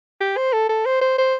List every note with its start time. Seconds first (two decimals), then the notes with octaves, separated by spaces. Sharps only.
0.21 G4
0.37 C5
0.53 A4
0.69 A4
0.86 C5
1.01 C5
1.18 C5